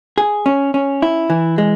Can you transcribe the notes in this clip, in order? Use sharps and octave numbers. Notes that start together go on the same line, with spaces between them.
G#4
C#4
C#4
E4
E3
G#3